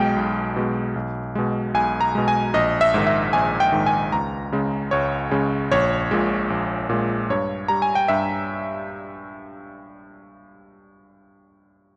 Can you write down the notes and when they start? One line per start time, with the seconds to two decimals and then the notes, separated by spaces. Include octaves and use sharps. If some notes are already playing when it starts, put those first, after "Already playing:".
Already playing: B1 B2 G#3 G5
0.16 B1
0.56 B2 G#3
0.96 B1
1.35 B2 G#3
1.74 B1 G#5
2.01 A#5
2.15 B2 G#3
2.28 G#5
2.54 A#1 D#5
2.81 E5
2.94 G#2 D#3
3.07 E5
3.33 A#1 G#5
3.60 G5
3.72 G#2 D#3
3.86 G#5
4.12 C#2 A#5
4.52 C#3 G#3
4.91 C#2 C#5
5.31 C#3 G#3
5.71 A#1 C#5
6.11 A#2 G#3
6.50 A#1
6.89 A#2 G#3
7.30 G2 C#5
7.68 G3 A#5
7.82 G#5
7.95 G5
8.08 G2 E5